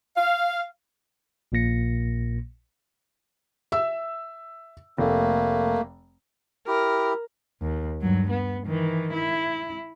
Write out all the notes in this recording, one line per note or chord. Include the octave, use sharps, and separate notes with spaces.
F5
A#1 A#2 A#3 A#6 C#7
E5 E6
F1 A3 A#3
E4 G4 A#4
D#2
G2 F#3
B3
D#3 E3
E4